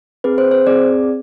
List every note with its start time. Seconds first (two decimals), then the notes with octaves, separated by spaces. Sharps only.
0.24 C4 G#4 B4
0.38 C5
0.51 C5
0.67 C4 G#4 D5